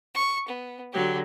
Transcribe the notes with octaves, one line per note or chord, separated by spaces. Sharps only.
C#6
B3
D3 F#3 G4